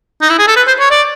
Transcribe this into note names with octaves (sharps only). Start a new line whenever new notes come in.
D#4
E4
G#4
A4
B4
C5
C#5
D5